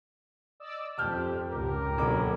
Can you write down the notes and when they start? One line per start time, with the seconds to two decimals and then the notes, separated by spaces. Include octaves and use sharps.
0.60 D5 D#5 E6
0.98 F2 G4 A5 F6 G6
1.50 C#2 G#2 A#4
1.98 D#1 B2 D3 F#3 D6